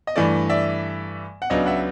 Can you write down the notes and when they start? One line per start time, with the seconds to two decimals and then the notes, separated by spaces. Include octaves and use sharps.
0.07 D#5
0.16 G2 E3 A3 D5
0.49 D5 E5
1.42 F#5
1.50 C#2 C#3 F#3 B3 D4 D#5 F5
1.66 E5 F#5